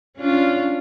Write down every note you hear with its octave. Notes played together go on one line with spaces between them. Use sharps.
C#4 D4 F4